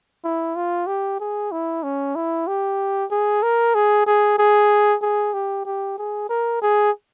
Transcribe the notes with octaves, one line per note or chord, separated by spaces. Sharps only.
E4
F4
G4
G#4
E4
C#4
E4
G4
G#4
A#4
G#4
G#4
G#4
G#4
G4
G4
G#4
A#4
G#4